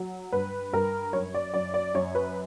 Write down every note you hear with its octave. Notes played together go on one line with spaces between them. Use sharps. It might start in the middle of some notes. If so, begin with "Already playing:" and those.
Already playing: F#3
G2 B4
G2 A#4
F#2 C#5
D5
F#2 D5
D5
F#2 C#5
B4